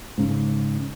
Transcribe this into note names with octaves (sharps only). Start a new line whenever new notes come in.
G#2 C#3